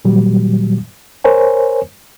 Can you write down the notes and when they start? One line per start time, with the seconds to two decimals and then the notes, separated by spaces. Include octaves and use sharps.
0.05 A#2 D#3 F#3 G3
1.24 A#4 C5 C#5 G#5